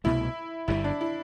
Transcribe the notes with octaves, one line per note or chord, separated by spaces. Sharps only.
C2 B2 A3 E4
G1 G2 D3 G3 E4
D4
E4